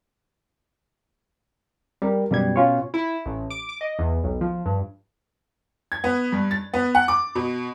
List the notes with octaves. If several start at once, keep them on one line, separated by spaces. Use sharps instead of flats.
G3 A#4
F#2 B2 G3 G#6
C#4 F4 C#5
E4
A1
D6
D6
D#5
E2
B1
F3
G2
G#6
B3
G2
A6
B3
F#5
D6
B2